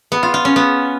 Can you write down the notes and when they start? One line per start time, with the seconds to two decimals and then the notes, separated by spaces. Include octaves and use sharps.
0.12 B3
0.23 F4
0.34 F4
0.45 C#4
0.56 B3